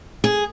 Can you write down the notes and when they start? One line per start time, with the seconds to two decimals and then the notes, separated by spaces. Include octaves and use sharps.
0.24 G#4